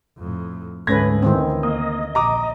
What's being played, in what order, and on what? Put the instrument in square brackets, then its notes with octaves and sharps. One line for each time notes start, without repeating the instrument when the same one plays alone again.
[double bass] F2 A2
[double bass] D2 [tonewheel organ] G#2 [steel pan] A3 C#4 B4 [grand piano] G#6 A#6
[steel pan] D#3 E3 C4
[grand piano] A#3 [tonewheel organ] D#5
[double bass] A#1 [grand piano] A#5 D6 D#6